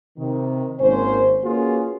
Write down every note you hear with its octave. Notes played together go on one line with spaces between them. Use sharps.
C3 D#3
G#1 A#3 C#4 C5
A#3 C#4 F4 F#4 G#4 B4